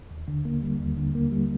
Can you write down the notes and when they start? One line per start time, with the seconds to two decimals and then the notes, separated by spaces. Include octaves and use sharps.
0.11 D#2
0.28 D3
0.45 A#3
0.62 G3
0.80 D#2
0.97 D3
1.15 A#3
1.32 G3